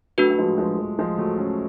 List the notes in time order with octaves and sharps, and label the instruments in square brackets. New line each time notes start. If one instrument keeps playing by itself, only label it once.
[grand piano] F#3 A3 [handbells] D4 F#4 B4
[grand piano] A3
F3 G#3
F3 G#3
F3
F3 G#3
F#3 A3
A3 C#4